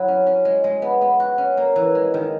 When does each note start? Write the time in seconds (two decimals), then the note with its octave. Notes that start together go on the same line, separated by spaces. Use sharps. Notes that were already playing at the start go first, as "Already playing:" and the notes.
Already playing: F#3 E4
0.08 C#4
0.27 C#4
0.45 G#3
0.64 G#3
0.82 B3
1.01 B3
1.20 F#4
1.38 C#4
1.57 A#3
1.76 E3
1.95 G#3
2.14 D#3